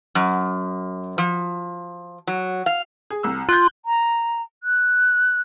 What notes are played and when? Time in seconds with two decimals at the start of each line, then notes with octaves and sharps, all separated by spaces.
0.15 F#2
1.18 F3
2.27 F#3
2.66 F5
3.10 G#4
3.23 C2 E6
3.49 F4 F#6 G6
3.86 A#5
4.63 F#6